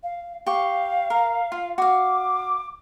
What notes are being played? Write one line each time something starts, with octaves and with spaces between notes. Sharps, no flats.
F5
G4 F5 C#6
A#4
F4
F#4 F5 D6